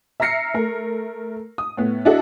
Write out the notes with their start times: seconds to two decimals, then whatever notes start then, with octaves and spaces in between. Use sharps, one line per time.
0.20 E5 A#5 F6 A#6 C7 C#7
0.54 A3 A#4
1.58 D#6
1.77 A2 B3
2.05 D4 E4 F#4 G#4 A4 D#5